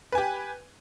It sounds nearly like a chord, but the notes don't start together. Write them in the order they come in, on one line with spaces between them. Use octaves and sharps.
B4 G#5 G4